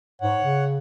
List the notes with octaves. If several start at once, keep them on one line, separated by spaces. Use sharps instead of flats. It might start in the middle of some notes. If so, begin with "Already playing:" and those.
G#2 C#5 F#5
C#3